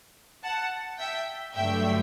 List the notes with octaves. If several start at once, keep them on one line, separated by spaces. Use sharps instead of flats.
F#5 A5
E5 G5
G2 D3 F#3 A3 E5 G5